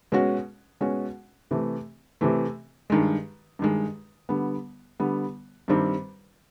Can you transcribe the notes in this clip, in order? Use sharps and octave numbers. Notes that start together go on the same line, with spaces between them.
B2 G#3 C#4 F#4
B2 G#3 C#4 F#4
C3 E3 A3
C3 E3 A3
G2 D#3 G#3
G2 D#3 G#3
D3 G3 B3
D3 G3 B3
G2 D#3 G3 C4